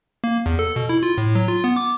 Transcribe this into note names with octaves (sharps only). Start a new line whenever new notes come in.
A#3
E2
A4
B2
E4
F4
A2
F#3
F4
B3
D6